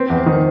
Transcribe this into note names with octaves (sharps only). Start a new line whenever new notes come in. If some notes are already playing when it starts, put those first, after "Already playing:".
Already playing: C4 B4
E2
C5
D#3
C5